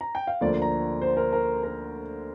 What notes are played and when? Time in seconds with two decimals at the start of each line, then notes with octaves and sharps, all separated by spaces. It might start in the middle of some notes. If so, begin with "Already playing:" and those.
0.01 A#5
0.15 G5
0.27 F5
0.41 D2 D3 F3 A#3 D5
0.62 A#5
1.02 C5
1.17 A#4
1.33 A#4
1.63 A#4